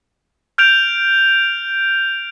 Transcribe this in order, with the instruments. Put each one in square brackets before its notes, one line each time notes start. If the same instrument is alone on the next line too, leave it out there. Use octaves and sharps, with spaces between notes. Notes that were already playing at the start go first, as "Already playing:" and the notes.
[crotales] F6 G6 D7 F7